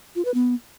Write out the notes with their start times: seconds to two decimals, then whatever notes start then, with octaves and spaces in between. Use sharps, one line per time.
0.16 F4
0.25 B4
0.34 B3